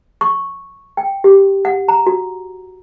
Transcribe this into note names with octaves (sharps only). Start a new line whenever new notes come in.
C#6
G5
G4
F#5
A#5
F#4